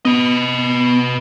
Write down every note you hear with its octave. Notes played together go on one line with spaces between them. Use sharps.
B3 B4 D#5